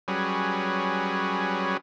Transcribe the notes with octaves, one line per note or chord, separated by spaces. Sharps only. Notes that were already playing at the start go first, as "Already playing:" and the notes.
F#3 G3 C#4 G#4 B4